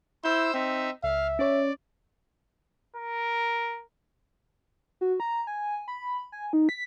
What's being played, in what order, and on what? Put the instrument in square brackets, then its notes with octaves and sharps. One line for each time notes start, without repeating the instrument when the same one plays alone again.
[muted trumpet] E4 [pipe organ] C5 E6 G6
[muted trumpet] C4 [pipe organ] D#4 E5
[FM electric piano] C#2 [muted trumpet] E5 [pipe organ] F5
[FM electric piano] C#4 C#5 [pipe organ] D5
[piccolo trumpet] A#4
[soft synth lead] F#4
A#5
G#5
B5
G#5
D#4
B6